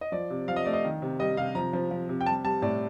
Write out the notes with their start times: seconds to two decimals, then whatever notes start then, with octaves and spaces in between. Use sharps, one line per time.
0.01 D#5
0.12 F3 D5
0.30 C3
0.48 F3 F5
0.56 D#5
0.65 A3 D5
0.74 D#5
0.84 D#3
1.02 C3
1.19 G3 D#5
1.37 C3 F5
1.55 F3 A#5
1.73 F3
1.91 F3
2.09 C3
2.21 G5
2.26 G3 A5
2.44 G3 A5
2.62 A2 D5